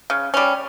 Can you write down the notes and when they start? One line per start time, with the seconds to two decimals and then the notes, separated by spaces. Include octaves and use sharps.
0.10 C#3
0.34 G3 C#4